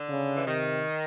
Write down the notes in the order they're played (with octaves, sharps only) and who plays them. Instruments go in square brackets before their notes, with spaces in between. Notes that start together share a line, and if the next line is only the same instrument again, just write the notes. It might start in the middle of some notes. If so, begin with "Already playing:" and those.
Already playing: [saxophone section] D3
[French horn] C#3
[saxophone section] E3
[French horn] C3 [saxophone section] D#3